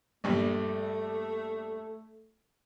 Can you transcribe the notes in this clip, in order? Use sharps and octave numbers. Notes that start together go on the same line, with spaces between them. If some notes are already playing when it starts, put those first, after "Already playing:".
A#1 G2 G3 A3